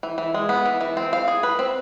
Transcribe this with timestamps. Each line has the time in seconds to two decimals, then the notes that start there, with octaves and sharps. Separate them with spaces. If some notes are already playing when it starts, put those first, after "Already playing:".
0.03 E3
0.18 E3
0.34 G#3
0.49 B3
0.66 E3
0.81 E3
0.97 C4
1.13 F5
1.28 G#4
1.43 B4
1.59 C4